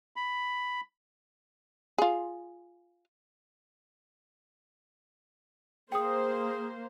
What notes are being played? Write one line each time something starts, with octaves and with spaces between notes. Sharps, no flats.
B5
F4 G#4
A#3 G#4 C5 G5 D#6